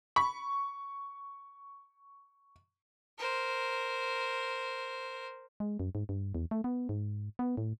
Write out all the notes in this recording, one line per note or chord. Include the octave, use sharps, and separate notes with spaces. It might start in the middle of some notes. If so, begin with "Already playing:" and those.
B5 C#6
A#4 C5
G#3
F#2
G#2
G2
E2
A3
B3
G#2
B3
A2